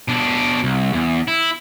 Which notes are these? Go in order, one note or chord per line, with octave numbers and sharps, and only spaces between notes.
B2 D4
C2
E2
E4